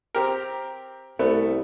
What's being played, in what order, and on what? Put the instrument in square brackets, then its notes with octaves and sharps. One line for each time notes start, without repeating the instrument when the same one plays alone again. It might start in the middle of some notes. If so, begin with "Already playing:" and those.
[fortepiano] C4 G4 A#4
[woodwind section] C2 [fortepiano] A3 B3